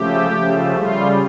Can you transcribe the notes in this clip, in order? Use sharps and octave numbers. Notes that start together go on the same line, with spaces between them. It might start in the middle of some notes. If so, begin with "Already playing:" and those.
Already playing: C#3 F3 A3 G4
C#3 F3 A3
C#3 G3 F4